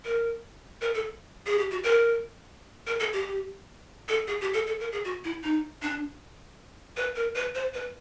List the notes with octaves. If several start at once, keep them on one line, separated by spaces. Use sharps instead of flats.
A#4
A#4
A4
G#4
G4
F#4
A#4
A#4
A4
G4
A4
G#4
G4
A4
A4
A#4
G#4
F#4
E4
D#4
D4
B4
A#4
B4
C5
B4